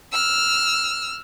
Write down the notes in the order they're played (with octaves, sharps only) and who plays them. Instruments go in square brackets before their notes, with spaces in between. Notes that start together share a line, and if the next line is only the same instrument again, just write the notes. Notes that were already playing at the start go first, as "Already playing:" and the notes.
[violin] E6 F6